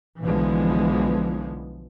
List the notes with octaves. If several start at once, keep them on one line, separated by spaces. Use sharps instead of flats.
B1 D3 E3 F3 G#3 B3